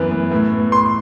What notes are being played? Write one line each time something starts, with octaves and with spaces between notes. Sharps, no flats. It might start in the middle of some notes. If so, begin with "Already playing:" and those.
Already playing: F#2 E3 B3
B3
A2
B3
A2 C6